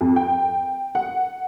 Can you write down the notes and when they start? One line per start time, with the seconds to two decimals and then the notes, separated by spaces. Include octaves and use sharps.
0.01 F2
0.16 G5
0.95 F#5